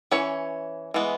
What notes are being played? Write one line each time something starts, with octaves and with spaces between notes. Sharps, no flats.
E3 C#4 C#5
E3 G#3 B3